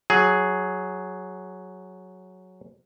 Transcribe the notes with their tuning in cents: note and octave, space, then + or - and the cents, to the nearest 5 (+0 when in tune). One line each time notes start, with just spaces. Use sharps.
F#3 +0 G#4 +5